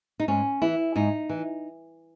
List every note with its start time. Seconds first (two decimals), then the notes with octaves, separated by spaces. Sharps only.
0.20 D#4
0.28 G#2 C#4
0.62 E3 E4
0.96 G#2 D#4
1.29 E3